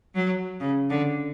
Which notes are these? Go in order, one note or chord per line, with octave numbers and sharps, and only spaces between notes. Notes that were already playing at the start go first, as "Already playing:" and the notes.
F#3
C#3
D3